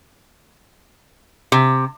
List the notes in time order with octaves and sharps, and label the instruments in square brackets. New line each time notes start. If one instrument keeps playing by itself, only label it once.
[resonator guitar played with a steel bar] C3